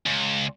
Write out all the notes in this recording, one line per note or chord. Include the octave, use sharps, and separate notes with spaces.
C#2